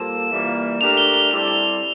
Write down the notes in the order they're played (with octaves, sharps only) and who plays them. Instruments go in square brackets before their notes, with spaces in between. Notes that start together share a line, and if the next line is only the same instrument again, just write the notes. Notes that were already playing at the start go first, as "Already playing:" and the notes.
Already playing: [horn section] G3 A#3 F4 A4 C5 [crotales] E7
[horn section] E3 G3 A#3 F4
[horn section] A3 D4 G4 A#4 [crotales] F7
[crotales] G7
G7
[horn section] G3 C4 E4 A4 D5 [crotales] F7
[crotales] F7